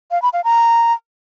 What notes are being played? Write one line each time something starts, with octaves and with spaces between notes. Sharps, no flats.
F5
B5
F5
A#5